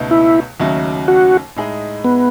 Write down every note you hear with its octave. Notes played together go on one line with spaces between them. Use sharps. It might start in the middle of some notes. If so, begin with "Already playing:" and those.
Already playing: C#2 B2 A3 D#4
E4
D#2 C#3 F#3 A3 D#4
F#4
A2 G#3 D#4 G#4
B3